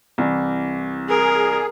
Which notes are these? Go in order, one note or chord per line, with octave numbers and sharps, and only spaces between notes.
C2 E3
G#4 A#4